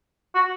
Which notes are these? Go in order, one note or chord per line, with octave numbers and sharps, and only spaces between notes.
F#4